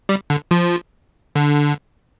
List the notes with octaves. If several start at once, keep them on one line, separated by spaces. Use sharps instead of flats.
G3
D3
F3
D3